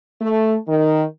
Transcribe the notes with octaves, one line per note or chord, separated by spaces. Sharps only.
A3
D#3